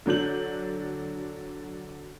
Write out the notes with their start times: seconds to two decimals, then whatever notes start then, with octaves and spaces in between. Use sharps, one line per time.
0.06 D3 F#3 D4 G6 F#7